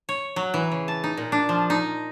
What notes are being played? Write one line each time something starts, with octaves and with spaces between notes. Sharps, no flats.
C#5
F#3
E3
C#3
A5
D#4
A#2
D4
F3
D#4